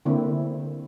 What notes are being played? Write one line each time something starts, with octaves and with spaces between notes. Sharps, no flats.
D3 A#3 C4 E4